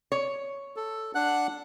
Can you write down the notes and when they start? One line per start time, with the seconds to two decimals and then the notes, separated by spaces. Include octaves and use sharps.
0.12 C#5
0.76 A4
1.15 D4 F#5 F#6